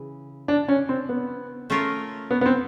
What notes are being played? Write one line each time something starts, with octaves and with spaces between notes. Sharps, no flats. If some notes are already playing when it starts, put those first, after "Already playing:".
Already playing: C#3 E3
D4
C#4
C4
B3
A3 C#4 F4 A#4
B3
B3
C4